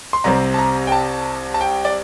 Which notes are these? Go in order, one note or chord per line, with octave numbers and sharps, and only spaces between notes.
C6
C2 C3 G3 C4 A#5
A5
A#5
G5
A5
A5
G5
D5